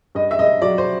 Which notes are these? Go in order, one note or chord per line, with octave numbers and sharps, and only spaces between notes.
G2 D#5
E5
G2 D#5
F#3 D5
C5